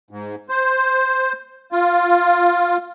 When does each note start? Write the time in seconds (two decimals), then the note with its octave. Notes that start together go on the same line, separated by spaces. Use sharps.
0.11 G#2
0.49 C5
1.72 F4